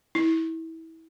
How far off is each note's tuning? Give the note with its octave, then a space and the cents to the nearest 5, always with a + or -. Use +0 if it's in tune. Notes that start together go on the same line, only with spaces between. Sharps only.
E4 -25